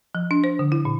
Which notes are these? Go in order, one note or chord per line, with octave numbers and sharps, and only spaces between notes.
F3
D4
C5
D3
E4
A#2